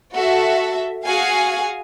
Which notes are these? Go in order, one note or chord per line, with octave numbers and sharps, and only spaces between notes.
F#4 A4 E5
F#4 G#4 F5 G#5